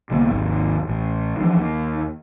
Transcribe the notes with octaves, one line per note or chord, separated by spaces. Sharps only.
C2 D3 A#3 B3
G#1 D#2
A1
E3 F3 D4
D#2